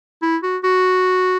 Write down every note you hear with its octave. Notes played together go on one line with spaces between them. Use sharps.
E4
F#4
F#4